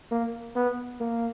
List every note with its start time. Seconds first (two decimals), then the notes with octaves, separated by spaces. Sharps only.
0.11 A#3
0.56 B3
1.00 A#3